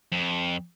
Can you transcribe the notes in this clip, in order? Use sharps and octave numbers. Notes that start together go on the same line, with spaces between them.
F2